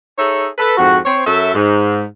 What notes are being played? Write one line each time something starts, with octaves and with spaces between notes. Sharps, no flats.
D#4 G#4 A4 C#5 E5
A4 B4
F2 G#2 F#4
C4 C5 C#5
F#2 A4 C#5 E5
G#2